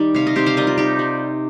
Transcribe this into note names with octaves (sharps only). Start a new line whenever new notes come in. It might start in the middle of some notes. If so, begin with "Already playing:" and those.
Already playing: D#3 G3 D#4 G4
C3 F5
D#5
C4 G4 C5
C5 F5
G3 A#4 D#5
F4
D#4 G4
G3